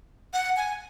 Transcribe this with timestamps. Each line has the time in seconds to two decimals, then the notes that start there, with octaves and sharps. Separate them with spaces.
0.33 F#5
0.56 G#5